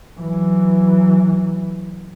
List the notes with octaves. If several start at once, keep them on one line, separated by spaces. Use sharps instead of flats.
E3 F#3